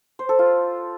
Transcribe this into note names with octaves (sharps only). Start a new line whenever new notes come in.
C5
A4
F4